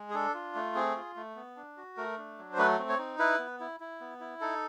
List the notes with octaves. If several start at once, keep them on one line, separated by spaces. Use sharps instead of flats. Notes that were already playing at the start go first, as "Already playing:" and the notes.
Already playing: G#3
G#4
D4 A4
F4
A3
C4 G#4
F4
A3
B3
D4
F#4
A3 A#4
D4
F#3
C5
A3 B4
C4
C#5
D#4
E4 B4
B3
E4
E4
B3
E4
D#4 A4